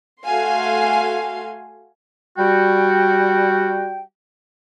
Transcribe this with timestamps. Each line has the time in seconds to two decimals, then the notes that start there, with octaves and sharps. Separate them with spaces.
0.24 A3 F#4 F5 G#5 C6
2.37 G3 F#4 G5